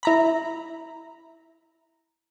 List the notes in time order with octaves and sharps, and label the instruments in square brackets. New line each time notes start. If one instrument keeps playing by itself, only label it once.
[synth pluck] E4 A#5 B5